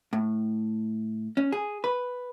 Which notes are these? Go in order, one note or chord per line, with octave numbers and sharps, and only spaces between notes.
A2
C#4
G#4
B4